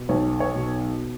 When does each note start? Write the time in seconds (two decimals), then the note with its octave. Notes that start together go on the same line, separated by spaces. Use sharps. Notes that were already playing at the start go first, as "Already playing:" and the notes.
Already playing: B2
0.09 B1 C#5
0.40 C#5
0.55 B2